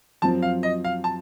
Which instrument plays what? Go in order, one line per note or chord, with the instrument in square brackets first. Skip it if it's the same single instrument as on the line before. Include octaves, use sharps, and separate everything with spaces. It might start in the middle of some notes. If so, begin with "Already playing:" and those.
[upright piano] F#2 F3 C4 [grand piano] A5
[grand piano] F5
D#5
F5
A5